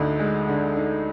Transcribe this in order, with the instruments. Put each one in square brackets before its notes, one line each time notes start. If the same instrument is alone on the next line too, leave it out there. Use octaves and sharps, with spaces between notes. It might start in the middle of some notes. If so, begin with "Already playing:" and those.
Already playing: [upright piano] D2 D3 D#4
G#3
D3
D#4